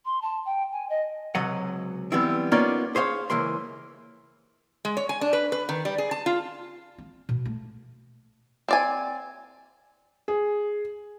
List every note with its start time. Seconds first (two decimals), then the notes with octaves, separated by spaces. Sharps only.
0.05 C6
0.22 A5
0.46 G5
0.72 G#5
0.90 D#5
1.35 C#2 C3 F#3 D#5 F#5
2.12 E3 G3 B3 C4 E4
2.52 A#3 B3 C#4 D#4 F4 D5
2.95 G#4 C5 C#5 F5
3.30 C#2 E3 A#3 C6
4.85 G#3
4.97 C#5
5.09 G#5
5.21 D4
5.33 B4
5.52 B4
5.69 D#3
5.85 G3
5.98 G#4
6.11 A5
6.26 F4
6.98 C4
7.29 B2
7.45 A3
8.68 C4 D5 G#5
10.28 G#4